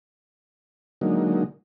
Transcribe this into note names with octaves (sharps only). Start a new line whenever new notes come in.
D3 F#3 G#3 A#3 D#4